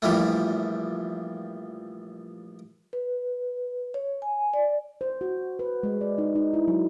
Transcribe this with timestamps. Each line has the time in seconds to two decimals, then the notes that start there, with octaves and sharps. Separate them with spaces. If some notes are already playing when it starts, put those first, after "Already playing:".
0.02 A#1 E3 F3 G3 A3
2.93 B4
3.94 C#5
4.22 G#5
4.54 D5
5.01 C5
5.21 F#4
5.59 B4
5.83 G#3
6.01 D5
6.18 D#4
6.35 D#4
6.54 E4
6.68 F#3